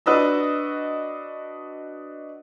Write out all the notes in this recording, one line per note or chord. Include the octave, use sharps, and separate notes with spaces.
D4 F#4 B4 D#5 E6